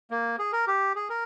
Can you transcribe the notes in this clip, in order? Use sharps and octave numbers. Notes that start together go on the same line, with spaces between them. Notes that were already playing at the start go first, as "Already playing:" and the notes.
A#3
G#4
A#4
G4
G#4
A#4